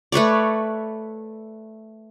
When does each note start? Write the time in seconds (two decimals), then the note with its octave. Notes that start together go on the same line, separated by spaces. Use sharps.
0.12 A3 B4 C#5 D5